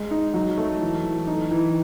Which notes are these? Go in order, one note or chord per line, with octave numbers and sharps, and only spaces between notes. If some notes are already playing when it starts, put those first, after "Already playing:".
Already playing: G#3
D#4
F#3
A3
E3
E3
D#4
E3